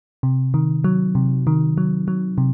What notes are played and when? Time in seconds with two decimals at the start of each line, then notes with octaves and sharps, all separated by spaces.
0.23 C3
0.54 D#3
0.84 F#3
1.15 C3
1.47 D#3
1.78 F#3
2.08 F#3
2.38 C3